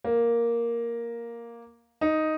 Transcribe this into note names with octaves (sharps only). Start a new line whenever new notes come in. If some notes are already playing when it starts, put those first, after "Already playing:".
A#3
D#4